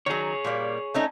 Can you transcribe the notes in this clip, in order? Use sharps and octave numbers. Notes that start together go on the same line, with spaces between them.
D#3 F#3 G#4 C#5
A#2 G3 A#3
A3 C#4 D#4